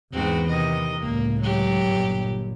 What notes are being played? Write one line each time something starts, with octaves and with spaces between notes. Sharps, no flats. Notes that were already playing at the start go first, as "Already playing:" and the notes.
E2 G#2 B3 C4 F#4
C3 D#3 D#5
C#2 A2 A#3
F#3 G4
G1 A#2